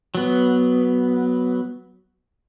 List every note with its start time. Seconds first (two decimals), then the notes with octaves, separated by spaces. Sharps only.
0.15 F#3 B3